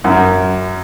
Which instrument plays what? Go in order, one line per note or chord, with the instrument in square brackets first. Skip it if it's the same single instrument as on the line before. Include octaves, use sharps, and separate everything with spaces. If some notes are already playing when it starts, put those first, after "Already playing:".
[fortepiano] F#2